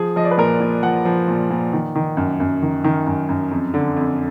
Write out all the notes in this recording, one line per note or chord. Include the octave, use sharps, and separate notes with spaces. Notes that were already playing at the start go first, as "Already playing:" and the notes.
Already playing: F3 G#4
F3 D#5
D5
B4
A#2 A#4
A#2
F3 F#5
F3
A#2
A#2
D#3
D#3
F#2
F#2
D#3
D#3
F#2
F#2
F2
D3
F2